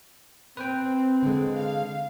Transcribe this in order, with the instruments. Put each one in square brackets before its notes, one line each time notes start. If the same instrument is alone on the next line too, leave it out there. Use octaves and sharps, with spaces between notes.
[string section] C4 [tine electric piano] B4 C5 G5
[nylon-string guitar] D3 G#3
[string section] F5